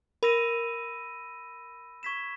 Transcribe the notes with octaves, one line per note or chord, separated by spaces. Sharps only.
A#4 B5 E6 A#6 D#7
C#6 G#6 B6 E7